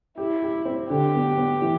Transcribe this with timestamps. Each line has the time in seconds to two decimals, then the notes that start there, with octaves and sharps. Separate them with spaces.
0.18 E4 G4
0.43 G4
0.65 C4
0.90 D3 G4
1.14 B3
1.37 B3
1.62 E3